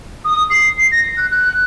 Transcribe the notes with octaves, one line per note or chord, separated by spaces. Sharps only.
D#6
C7
C7
A#6
F#6
F#6